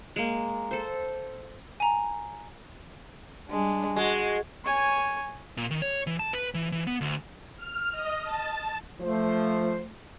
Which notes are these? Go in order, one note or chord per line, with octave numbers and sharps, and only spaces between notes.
G#3 A#3
A4 C5
G#5 A#5
G3 G#3 D4
G#3 F#4
C#5 G#5
A#2
D#3
C#5
E3
A5
B4
E3
E3
B3
D2
F6
D#5
A5
F3 A3 C5